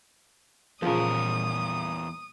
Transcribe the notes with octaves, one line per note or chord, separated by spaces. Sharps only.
E2 A#2 C#3 F3 G3 A#4 D#6